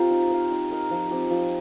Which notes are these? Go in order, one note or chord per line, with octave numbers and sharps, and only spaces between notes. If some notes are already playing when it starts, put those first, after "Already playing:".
Already playing: C4 F4 G4 A#4 C5
D#4
C5 F5
D#4
A#4 D#5
F3
C4 G4
F3